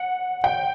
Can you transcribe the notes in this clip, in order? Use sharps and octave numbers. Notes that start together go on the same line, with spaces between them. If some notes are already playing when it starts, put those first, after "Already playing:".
Already playing: F#5
G5